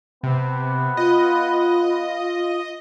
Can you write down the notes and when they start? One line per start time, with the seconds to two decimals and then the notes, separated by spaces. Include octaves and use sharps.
0.23 C3 B3
0.97 F4 D#5